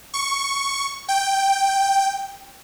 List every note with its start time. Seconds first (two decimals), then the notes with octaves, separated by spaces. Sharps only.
0.14 C#6
1.09 G5